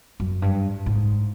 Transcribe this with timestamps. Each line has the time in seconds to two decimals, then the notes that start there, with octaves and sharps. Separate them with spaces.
0.20 F#2
0.42 G2
0.86 G#2